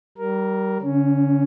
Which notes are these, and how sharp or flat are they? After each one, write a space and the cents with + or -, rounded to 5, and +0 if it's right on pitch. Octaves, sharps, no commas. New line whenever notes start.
G3 -25 A#4 +0
D3 -45 C#4 +0